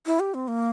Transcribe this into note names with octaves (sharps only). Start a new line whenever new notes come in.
E4
G4
C4
A#3